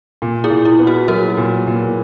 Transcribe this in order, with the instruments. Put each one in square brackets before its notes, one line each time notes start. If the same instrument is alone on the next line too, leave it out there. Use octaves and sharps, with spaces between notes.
[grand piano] A#2
[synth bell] E4 G#4
[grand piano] A#2
[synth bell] E4
[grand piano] B3
[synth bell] F#4
[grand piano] F#3 [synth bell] F#4 A#4
[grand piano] A#2
A#2